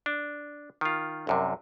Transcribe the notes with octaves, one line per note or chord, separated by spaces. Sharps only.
D4
D#3 F4
C2 F#2 C3